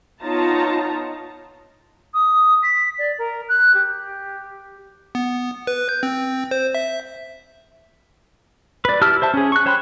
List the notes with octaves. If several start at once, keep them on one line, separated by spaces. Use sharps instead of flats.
B3 D#4 F4 C#5 A5 A#5
D#6
B6
D5
A#4
F#6
G4
B3
B4
G6
C4
C5
E5
B4 D5
E4 G4 A5 E6 F6
C5 E5 A5
C#4 G#4
C#6 F#6
C5 C#5 G5 B5 C6